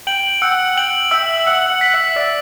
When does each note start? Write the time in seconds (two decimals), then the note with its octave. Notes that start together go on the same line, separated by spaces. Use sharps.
0.07 G5 F#7
0.42 F#5 E6
0.77 G5 F#7
1.11 E5 E6
1.46 F#5 E6
1.70 F#5
1.81 B6
1.94 E5
2.16 D5 E6